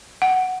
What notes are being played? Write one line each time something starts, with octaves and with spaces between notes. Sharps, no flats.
F#5